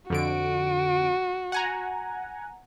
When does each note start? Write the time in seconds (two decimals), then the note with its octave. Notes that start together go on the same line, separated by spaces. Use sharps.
0.10 F2 D3 F#4 D7
1.52 F#5 G#5 A#5